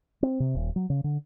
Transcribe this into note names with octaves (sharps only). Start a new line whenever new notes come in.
C4
C3
D#1
F#3
C#3
D3